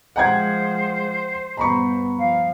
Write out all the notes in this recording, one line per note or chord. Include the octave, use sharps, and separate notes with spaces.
F3 G#3 C5 F#5 G5 G#6
G2 B3 A#5 B5 C#6
F3 F5